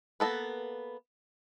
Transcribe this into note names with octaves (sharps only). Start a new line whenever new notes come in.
A#3 B3 A4 B4